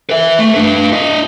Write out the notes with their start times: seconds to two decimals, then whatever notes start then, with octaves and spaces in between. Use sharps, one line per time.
0.10 B4 E5
0.39 A3
0.54 D4 B4
0.92 E4 D#5